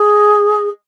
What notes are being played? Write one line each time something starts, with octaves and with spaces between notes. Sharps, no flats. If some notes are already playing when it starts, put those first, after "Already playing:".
Already playing: G#4